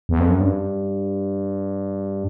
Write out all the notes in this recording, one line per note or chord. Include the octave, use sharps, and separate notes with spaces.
E2
F2
F#2
G2